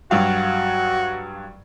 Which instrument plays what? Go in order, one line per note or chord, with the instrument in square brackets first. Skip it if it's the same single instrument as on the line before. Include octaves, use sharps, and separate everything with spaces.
[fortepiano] G2 F#3 F5 [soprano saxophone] F#4